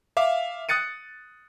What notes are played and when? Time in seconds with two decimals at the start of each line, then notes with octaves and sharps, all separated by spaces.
0.17 E5 F5 D6
0.69 D#6 F#6 A6 C#7 D#7